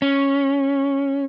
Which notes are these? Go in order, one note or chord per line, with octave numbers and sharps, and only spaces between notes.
C#4